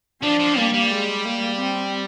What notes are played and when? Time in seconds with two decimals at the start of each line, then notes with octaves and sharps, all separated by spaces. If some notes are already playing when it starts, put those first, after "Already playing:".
0.23 F3 D4
0.40 F3
0.57 G3 A#3
0.74 G3
0.91 G#3
1.25 A#3
1.58 C4